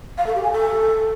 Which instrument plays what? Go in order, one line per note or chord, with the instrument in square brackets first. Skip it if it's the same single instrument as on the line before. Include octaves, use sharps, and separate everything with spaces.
[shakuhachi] F5
A4
G4
G#5
A4